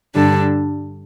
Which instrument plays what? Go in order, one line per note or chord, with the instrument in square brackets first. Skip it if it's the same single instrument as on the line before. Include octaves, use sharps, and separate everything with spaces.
[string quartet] G2 D3 G3 D4 A4